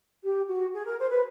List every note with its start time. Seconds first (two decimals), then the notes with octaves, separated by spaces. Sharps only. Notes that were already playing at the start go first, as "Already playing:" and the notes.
0.23 G4
0.48 F#4
0.74 G#4
0.86 A#4
0.99 C5
1.11 B4